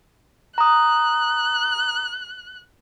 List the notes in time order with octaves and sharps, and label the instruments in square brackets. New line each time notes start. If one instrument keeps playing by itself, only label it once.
[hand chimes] A#5 D#6 [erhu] F#6